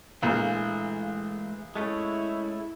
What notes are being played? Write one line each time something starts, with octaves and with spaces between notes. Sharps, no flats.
A#1 E3 G#3 A3 F5
G#3 A3 C#4 E4